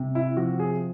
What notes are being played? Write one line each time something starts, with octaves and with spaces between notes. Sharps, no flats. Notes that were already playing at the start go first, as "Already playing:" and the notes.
Already playing: C3 G3
E4
F3 F#4
G#4